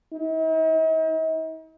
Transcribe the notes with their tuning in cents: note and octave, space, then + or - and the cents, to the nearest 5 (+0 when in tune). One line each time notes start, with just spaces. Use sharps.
D#4 +45